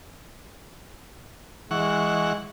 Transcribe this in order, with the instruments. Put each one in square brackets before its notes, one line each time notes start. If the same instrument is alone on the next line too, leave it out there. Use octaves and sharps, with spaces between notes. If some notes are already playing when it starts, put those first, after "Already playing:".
[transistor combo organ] E3 F#5 C#6 [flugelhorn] G#3